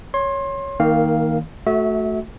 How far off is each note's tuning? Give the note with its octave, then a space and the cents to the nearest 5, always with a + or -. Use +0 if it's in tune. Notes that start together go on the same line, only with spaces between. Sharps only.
C#5 +0 C6 +25
D#3 +15 A#3 -15 F5 +0
A3 -5 F#4 +0 E5 -30